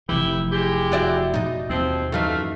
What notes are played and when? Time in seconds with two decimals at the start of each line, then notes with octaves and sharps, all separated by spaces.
0.09 F1 E3 E4 G4
0.51 G#3 E4 G4
0.92 F#4 D5 E5
1.34 B2 D#4
1.70 D#2 F3 C4
2.12 F#2 E3 A3 D#4 F5